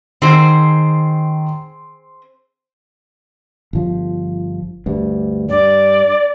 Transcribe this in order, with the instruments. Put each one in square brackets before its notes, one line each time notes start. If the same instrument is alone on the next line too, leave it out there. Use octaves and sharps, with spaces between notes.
[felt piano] D#3 [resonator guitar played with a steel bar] C4 G#4 C5
[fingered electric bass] G1 F3
D2 G2
[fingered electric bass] G2 [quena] D5